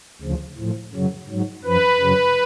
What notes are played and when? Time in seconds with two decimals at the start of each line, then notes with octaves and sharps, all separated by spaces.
0.22 D2 C#3 F3
0.58 A2 F3
0.93 F#2 C#3 F#3
1.29 G#2 F#3
1.64 F#2 F3 B4
2.00 F#2 C#3 F#3